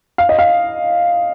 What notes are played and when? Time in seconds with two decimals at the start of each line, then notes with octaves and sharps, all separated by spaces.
0.18 F5
0.29 D#5
0.39 F5